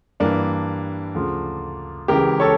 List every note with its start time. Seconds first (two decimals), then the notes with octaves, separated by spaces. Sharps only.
0.20 G2 E3 A#3 D4
1.15 D2 C#3 F3
2.08 C#2 C#3 E3 G4 A#4
2.40 A4 C#5